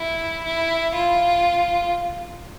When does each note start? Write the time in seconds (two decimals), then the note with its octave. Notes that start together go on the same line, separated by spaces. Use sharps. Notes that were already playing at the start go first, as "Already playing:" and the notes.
Already playing: E4
0.44 E4
0.95 F4